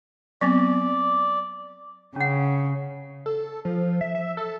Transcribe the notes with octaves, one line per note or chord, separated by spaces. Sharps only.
F#3 B3 C4 D5
C#3 C#4 F#5
A4
F3
E5
E5
A4